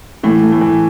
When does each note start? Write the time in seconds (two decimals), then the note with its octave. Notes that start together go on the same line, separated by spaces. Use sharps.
0.23 A2 E3
0.43 A3
0.52 A2
0.61 E3